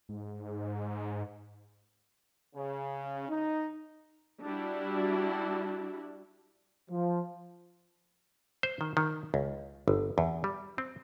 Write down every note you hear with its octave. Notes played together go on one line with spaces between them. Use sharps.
G#2
C#3
D#4
G3 D4 E4 F#4
F3
C5
D#3
D#3
C#2
G1
E2
G3
C4